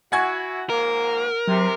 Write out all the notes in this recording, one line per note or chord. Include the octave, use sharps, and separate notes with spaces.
E4 F#4 F#5 G#5 G#6
G#2 F3 A#3 A#4
C3 F#3